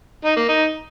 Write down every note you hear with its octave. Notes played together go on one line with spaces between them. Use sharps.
D#4
A#3
D#4